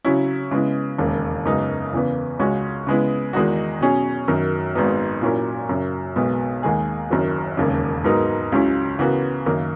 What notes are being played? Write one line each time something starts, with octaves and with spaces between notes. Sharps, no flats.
C#3 F#3 C#4 E4
C#3 G#3 B3 E4
E1 D#2 C#3
F#2 C#3 G#3 B3 D#4
E2 C#3 E3 B3
C#2 C#3 G#3 C#4 F#4
C#3 G#3 B3 E4
E2 D#3 G#3 D#4 F#4
B2 F#3 C#4 G#4
F#2 D#3 F#3
G#1 G#2 F#3 B3 D#4
A#2 F#3 C#4 E4 A#4
F#2 C#3 F#3
B1 B2 G#3 B3
D#2 D#3 G#3 D#4 G#4
F#1 F#2 D#3 F#3
E1 D#2 C#3
G#2 F#3 B3 D#4 A#4
C#2 C#3 F#3 C#4 E4
C#3 E3 B3 F#4 A#4
F#2 D#3 A#3